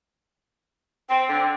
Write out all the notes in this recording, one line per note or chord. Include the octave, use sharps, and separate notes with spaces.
C4 G5
D3